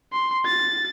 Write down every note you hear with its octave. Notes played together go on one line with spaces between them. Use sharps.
C6
A6